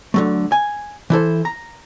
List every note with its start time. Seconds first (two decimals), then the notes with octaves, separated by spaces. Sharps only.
0.14 D3 F#3 A3
0.52 G#5
1.10 E3 E4 A4 C5
1.45 A#5